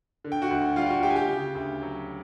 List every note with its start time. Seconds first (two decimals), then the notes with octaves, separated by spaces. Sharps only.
0.24 D3
0.32 G5
0.42 F#4 F#5
0.51 D2
0.76 G3 F4 F5
0.86 G5
0.90 F#4 F#5
1.03 D2 G4 G5
1.10 G#5
1.16 G4 G5
1.29 C#3
1.55 D2
1.82 F#3